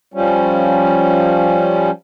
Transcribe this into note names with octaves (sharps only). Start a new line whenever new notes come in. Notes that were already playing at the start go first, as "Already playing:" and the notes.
F3 G3 C#4